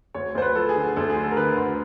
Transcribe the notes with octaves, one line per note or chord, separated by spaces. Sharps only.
D2 C#5
D2 C5
B4
F3 A4
G#4
D3
D2 A4
G#4
D3
A4
A#4
D3 B4
D2